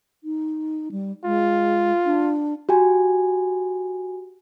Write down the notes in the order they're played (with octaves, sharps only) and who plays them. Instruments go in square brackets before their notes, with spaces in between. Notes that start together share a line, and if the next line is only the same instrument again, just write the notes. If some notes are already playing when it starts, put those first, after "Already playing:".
[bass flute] D#4
G3
[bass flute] G#3 [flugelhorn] F4
[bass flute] D4
[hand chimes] F#4 G4 G#5